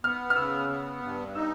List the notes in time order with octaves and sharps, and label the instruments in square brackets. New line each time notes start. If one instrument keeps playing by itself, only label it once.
[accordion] B3 [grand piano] F6
[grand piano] F6
[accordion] C#3 [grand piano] E6
[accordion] B3
G2
[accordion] D#4 [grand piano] E6